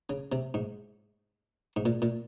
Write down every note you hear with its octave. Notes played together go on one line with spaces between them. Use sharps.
C#3
C3
G#2
G#2
A#2
A#2